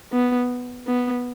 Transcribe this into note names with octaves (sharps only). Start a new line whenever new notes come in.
B3
B3